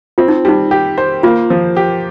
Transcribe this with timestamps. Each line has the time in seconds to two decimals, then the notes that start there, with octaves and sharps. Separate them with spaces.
0.18 C4 F4
0.28 D#4
0.45 G3 D#4
0.71 G4
0.98 C5
1.23 A#3 F4
1.50 F3
1.77 G4